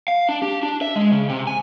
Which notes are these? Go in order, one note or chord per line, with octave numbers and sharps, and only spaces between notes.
F5
D4
G4
D4
E5
G#3
C#3
C3
G#5